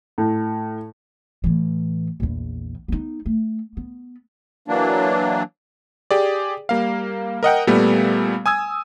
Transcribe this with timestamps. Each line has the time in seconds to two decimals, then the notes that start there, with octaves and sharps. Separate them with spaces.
0.18 A2
1.44 A2 E3
2.20 A#1 E2
2.88 B3 D#4
3.26 A3
3.77 B3
4.68 E3 F#3 A#3 D4
6.11 G4 G#4 D5
6.69 G3 A#3 F5
7.43 A#4 D#5 F#5 G5
7.67 A#2 G3 A3 B3
8.46 G#5 D#6 E6 G#6